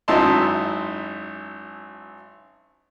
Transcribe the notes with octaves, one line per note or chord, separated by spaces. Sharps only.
G#1 F#2 D#4 E4 A5 C6